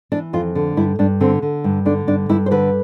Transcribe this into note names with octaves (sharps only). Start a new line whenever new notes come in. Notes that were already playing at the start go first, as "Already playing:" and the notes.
E3 D4
F2 F4
D3
G2 E4
G2 D4
D3 C4
D3
G2
D3 D4
G2 D4
G2 E4
C5
D3 B4